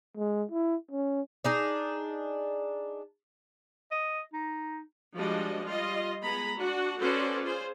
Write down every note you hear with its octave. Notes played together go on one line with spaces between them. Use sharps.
G#3
E4
C#4
D4 D#4 G#4
D#5
D#4
F3 G3 G#3 D4 F#4 D#5
G3 F4 D#5 C6
G#3 B3 G#4 A#5 B5
D4 F#4 F#5
C#4 F#4 A4 B4 C5 D5
F4 G#4 C5